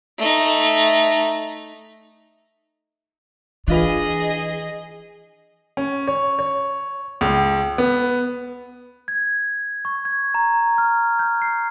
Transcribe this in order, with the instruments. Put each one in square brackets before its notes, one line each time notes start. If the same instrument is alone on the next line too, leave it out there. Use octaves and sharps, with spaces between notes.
[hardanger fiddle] A3 D#4
[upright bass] E3 [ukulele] D4 F4 B4 [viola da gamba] G#4 D#5
[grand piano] C#4
C#5
C#5
C#2
B3
[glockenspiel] G#6
C#6
G#6
A#5
F6
G6
C7